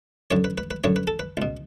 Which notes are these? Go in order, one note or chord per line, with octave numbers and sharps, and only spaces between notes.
F#2 D3 C#5
B4
B4
B4
F#2 D3 C#5
B4
A4
B4
C#2 B2